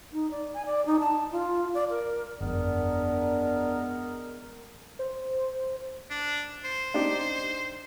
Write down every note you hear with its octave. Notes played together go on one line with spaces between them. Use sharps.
D#4
D5
G#5
D5
D#4
A5
F4
D5
A#4
G1 F2 G#3 B3 D4 A#4
C5
D4
C5
D4 D#4 G4